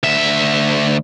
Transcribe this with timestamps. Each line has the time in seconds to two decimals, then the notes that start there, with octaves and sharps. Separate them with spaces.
0.03 D2 E5